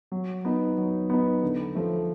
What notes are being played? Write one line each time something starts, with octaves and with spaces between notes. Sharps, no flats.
F#3
B3 D#4
F#3
B3 D#4
D3
F3 A3